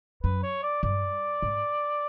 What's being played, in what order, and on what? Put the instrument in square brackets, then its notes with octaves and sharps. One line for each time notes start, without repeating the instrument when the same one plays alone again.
[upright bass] F#2 [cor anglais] B4
[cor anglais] C#5
D5
[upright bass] G2 [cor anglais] D5
[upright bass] G#2